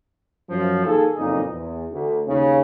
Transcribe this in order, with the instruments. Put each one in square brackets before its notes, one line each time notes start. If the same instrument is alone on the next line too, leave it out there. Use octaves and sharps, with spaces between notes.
[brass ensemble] F#2 F3
D#3 A#3 G#4 A4
F#1 F2 A#2 D#4 D#5
E2
D2
D#2 C#3